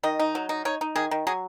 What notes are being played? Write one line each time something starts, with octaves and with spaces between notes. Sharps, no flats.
D#3 D#5
D#4
F#3
D#4
D#4 C#5
D#4
D#3 G#4
D#3
F#3 G#4